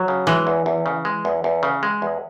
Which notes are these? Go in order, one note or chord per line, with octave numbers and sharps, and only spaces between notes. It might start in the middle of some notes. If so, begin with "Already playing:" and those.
Already playing: F#3
C#3
E3 G#3
E2
E2
C#3
G#3
E2
E2
C#3
G#3
E2